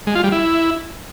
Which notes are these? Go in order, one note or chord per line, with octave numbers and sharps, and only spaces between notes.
G#3
F4
G3
E4